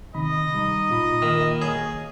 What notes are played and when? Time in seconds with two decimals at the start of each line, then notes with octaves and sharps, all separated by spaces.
0.15 C3 D#3 D#5 B5
0.54 G3 D#4
0.89 A#2 F4 B5
1.22 D#3 A#3
1.62 G#4 C#5